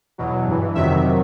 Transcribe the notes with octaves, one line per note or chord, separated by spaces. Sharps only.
E2 B2 F#3
G2 E3
F2 C3 D#3 F#3 E5